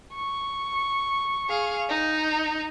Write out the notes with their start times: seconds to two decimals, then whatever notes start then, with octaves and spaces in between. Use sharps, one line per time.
0.15 C#6
1.49 G#4 F5
1.90 D#4